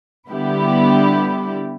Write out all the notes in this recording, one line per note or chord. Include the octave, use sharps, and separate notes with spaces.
D3 G3 B3 E4 G4